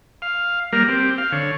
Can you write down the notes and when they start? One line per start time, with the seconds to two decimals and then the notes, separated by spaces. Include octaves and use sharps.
0.22 F5
0.73 G3 A#3 A#4
0.88 C4 G4
1.18 F5
1.32 D3 C#5